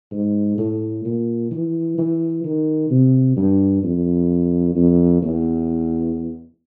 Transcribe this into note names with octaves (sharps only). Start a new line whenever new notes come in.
G#2
A2
A#2
E3
E3
D#3
C3
G2
F2
F2
E2